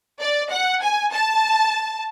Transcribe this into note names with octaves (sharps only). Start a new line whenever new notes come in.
D5
F#5
G#5
A5